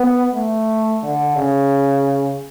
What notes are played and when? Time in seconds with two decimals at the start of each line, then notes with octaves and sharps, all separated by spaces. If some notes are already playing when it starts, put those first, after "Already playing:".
Already playing: B3
0.34 A3
1.03 D3
1.36 C#3